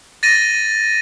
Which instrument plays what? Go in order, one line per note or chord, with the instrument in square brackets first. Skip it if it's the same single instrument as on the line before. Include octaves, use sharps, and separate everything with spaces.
[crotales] A6 A#6 D#7